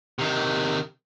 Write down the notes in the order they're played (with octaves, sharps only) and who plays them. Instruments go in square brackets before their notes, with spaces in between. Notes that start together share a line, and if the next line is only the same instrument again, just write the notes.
[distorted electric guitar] C3 D#3